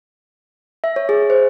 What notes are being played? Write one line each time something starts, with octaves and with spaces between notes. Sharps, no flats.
E5
C#5
G#4
C5